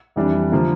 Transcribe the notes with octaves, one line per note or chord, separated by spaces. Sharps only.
F2 E3 G3 D4
D3 F3 A#3